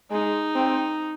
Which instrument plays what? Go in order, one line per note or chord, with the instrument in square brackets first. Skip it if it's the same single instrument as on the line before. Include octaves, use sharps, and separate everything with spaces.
[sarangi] G#3 [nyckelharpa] D#4
[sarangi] C4